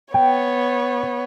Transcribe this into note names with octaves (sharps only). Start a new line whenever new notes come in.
B3 C#5 G5